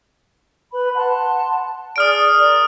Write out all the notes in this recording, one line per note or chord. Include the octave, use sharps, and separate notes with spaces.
B4 B5
F#5 A5 C6
G#4 D5 D#6 F6 D7
A#4 D5